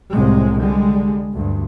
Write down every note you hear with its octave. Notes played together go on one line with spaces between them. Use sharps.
C2 A2 C3 G#3
D3 G3 G#3
D2 G2